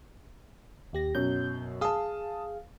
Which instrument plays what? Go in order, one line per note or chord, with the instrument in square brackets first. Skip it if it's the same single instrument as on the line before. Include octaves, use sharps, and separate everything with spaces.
[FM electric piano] D#2 G4 A#6
[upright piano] F#2 B2 F#3 [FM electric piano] G6
[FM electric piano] G#4 F5 [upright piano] A5 D#6